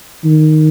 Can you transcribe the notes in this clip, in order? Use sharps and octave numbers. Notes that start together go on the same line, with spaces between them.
D#3